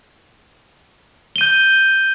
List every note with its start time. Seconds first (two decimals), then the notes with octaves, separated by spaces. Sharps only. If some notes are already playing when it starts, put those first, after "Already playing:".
1.36 G7
1.38 D#7
1.41 G6